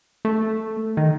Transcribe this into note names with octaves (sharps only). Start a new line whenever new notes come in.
A3
D#3